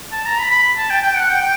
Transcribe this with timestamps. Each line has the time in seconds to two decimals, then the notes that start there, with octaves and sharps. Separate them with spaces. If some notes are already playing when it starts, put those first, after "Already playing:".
0.12 A5
0.26 A#5
0.39 B5
0.51 B5
0.77 A5
0.90 G5
1.03 G5
1.16 F#5
1.29 G5
1.41 G5